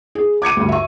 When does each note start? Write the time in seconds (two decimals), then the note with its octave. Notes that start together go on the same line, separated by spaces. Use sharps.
0.15 G#4
0.42 D6 G#6 C#7 D#7
0.57 D2 G2
0.69 E5 C#6